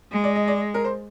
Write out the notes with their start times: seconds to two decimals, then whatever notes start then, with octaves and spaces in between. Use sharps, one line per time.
0.11 G#3
0.24 D5
0.36 D#5
0.48 D5
0.74 A#4
0.84 C5